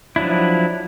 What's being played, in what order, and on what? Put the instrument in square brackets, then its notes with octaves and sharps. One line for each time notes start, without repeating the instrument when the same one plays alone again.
[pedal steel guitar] F3 F#3 D4 E4